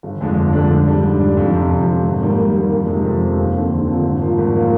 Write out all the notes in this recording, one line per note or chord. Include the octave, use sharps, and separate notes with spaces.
G1
F2 D3 G#3 D4
G1
F2 D3 G#3 D4
G#2
G3 D4
G#2
G3 D4
F2
C3 F3
F2
C3 F3
G#1
G#2 D#3 G3 A#3
G#1
G#2 D#3 G3 A#3
F2
C3 D#3 G#3 C4
F2
C3 D#3 G#3 C4
D#2
D3 F3 C4
D#2
D3 F3 C4
G#1
G2 F3 A#3 F4
G#1
F3 A#3 F4